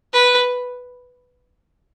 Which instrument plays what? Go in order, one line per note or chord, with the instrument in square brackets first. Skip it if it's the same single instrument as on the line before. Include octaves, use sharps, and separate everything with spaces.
[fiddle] B4